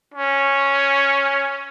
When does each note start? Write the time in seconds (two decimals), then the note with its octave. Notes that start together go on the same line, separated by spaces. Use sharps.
0.14 C#4